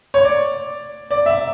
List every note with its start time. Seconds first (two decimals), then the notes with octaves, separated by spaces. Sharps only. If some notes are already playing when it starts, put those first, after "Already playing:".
0.14 C#5
0.25 D5
1.11 D5
1.26 E5